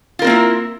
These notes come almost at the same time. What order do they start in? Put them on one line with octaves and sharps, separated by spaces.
F4 A#4 C4 A#3 E4